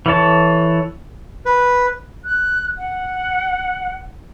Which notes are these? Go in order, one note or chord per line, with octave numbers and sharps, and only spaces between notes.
E3 A4 C#5 A5
B4
F#6
F#5